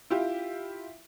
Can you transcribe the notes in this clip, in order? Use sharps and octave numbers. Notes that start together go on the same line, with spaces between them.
E4 F4 G4